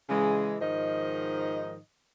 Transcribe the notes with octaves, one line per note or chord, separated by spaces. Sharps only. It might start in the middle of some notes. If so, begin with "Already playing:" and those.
C#3 E3 G#3
G#2 D#3 F3 D#4 D#5